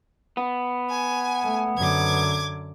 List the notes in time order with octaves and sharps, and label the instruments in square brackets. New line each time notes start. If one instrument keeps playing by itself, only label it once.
[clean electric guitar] B3
[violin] G#5
[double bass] A3
[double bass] F#2 D3 [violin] D6 G#6